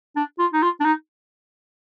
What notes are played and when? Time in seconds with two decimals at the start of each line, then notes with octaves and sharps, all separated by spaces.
0.16 D4
0.39 F4
0.53 D#4
0.62 F4
0.80 D4
0.85 D#4